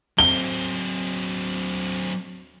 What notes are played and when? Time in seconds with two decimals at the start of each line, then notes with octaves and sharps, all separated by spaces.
0.18 F#3 C4 G7